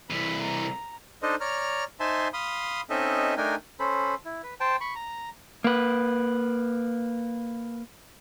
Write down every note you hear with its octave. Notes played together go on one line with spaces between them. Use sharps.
C2 E3 B5
A#5
D4 D#4 A4 C5 D#5
C#5 D5 A#5 F6
D#4 C5 E5 G#5 A5 C6
F5 B5 C6 D#6
C4 C#4 D#4 A4 D#5 E5
A3 D4 D#4 A#4 G5 G#5
C#4 A4 C5 B5
E4
B4
C5 G5 A5
B5 C#6
A#5
A#3 B4